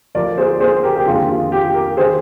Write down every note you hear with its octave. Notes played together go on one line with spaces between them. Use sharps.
D2 D3 F3 A#4 D5
G#4 C5
G#4 C5
G4 A#4
G4
F2 D#3 A#3 D4 F4 G#4
F4
G4
G4 A#4
D#3 G#4 C5